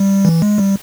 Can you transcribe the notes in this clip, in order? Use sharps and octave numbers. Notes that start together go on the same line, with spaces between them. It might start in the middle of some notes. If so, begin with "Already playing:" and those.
Already playing: G3
E3
G#3
G3